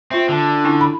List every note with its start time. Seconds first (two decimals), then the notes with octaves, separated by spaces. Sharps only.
0.11 C4 F4 E5
0.29 D3 D4
0.64 C#4 E4 G#5
0.81 B5